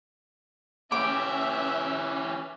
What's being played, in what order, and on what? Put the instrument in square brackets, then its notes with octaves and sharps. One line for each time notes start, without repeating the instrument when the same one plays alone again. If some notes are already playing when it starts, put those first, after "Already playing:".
[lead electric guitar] E3 G4 [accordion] C#4 [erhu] E5 [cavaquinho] D6